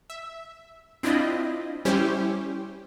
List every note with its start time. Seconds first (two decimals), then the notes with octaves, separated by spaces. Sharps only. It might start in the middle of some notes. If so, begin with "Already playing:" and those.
0.10 E5
1.03 C4 D4 E4 F4 D#5 B5
1.85 G3 C#4 E4 G4 C5